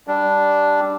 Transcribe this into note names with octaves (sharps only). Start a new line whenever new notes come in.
G3 D4